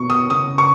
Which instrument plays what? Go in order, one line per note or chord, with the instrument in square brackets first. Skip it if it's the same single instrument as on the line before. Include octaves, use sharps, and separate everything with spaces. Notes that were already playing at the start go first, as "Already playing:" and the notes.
Already playing: [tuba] B2 [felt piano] C#6
[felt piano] D#6
[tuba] C#3 [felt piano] D#6
[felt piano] C#6